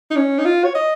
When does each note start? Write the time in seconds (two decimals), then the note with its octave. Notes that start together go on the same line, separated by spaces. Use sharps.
0.11 D#4
0.16 C#4
0.39 D#4
0.45 F4
0.64 C#5
0.75 D#5